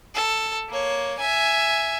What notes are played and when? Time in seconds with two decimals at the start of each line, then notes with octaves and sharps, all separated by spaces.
0.15 A4
0.69 A#3 C#5
1.19 E5 G#5